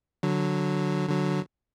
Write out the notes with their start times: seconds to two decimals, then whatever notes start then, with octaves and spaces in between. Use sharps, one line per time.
0.23 D3 F#3
1.09 D3 F#3